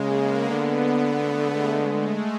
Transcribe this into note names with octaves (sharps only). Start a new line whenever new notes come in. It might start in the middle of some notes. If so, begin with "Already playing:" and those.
Already playing: C#3 G#3 A#3
B3
D3
A3
G#3
G#3
A3